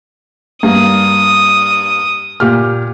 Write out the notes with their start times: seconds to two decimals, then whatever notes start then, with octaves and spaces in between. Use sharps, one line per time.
0.63 G2 A#3 D#6
2.40 A#2 G4 F6